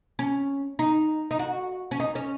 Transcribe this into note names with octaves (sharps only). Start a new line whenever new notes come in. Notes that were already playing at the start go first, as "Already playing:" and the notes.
C#4
D#4
D#4
F#4
C#4
D#4
C#4